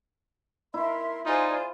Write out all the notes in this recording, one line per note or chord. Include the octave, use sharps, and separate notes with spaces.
E4 A#4 E5 C6
D#4 F4 G#4 C5 D5 G#5